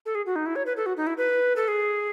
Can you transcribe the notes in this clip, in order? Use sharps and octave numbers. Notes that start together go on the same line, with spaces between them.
A4
G#4
F#4
D#4
E4
C#5
B4
A4
F#4
D#4
E4
B4
A4
G#4